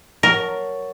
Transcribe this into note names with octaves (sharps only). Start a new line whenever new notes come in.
F#3 A#4 A5